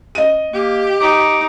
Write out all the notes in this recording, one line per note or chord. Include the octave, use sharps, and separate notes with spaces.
D#5 D#7
A#3 G4
D#4 D6